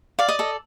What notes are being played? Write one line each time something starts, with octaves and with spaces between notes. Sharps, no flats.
D5 F5
D#5
A4 D#5